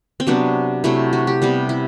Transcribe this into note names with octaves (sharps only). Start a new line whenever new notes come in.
C4
C3 F#3 B3 D4
C3 F#3 A3 E4
F#4
G4
C3 G3 B3
E4